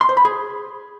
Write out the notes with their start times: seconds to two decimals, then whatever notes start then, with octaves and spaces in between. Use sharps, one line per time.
0.01 C6
0.09 C5
0.17 B5
0.25 G#4